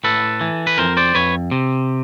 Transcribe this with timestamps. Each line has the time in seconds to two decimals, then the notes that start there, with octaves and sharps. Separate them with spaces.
0.04 A2 A4 B4
0.41 E3
0.67 B4
0.78 F2 A#4 C5
0.97 C5 D5
1.15 F2 B4 C#5
1.51 C3